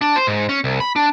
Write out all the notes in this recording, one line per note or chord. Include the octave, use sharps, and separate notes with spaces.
D4
C5
G#2
C#4
C2
B5
D4